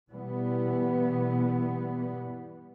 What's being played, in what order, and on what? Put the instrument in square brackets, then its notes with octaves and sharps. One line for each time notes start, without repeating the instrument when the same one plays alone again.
[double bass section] B2 E3 G3 B3